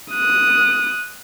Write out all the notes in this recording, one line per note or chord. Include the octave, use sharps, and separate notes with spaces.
D#6 F#6